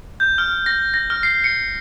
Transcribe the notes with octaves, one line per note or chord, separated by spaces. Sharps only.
G6
F6
A#6
A#6
F6
C7
C#7